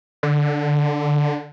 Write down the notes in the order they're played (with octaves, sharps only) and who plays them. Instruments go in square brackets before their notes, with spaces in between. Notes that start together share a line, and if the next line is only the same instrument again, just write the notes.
[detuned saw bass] D3